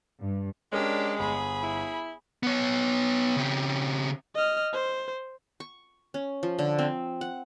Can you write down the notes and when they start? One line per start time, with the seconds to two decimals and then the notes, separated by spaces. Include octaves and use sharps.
0.22 G2
0.72 G#3 C#4 D4 G4 A#4 D5
1.19 G1 G#4 B5
1.63 E4
2.43 B3 C#5
3.36 C#3 C4
4.35 D#5 F6
4.73 C5
5.60 C#6
6.14 C#4
6.43 F3
6.59 D3
6.79 C4
7.21 F#5